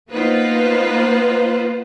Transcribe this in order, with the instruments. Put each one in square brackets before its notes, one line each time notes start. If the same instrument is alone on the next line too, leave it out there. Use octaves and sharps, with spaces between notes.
[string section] A#3 B3 D#4 F4 B4 C5